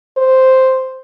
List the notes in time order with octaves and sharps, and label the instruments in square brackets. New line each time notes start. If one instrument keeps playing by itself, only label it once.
[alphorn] C5